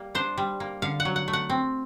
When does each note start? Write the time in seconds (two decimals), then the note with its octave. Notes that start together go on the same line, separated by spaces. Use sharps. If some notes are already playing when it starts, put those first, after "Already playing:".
Already playing: G3 A#3
0.15 D4 C5
0.38 G3
0.60 A#3
0.82 D3 F5
1.00 F#5
1.05 F#3
1.16 F#5
1.28 A3
1.33 F#5
1.50 C4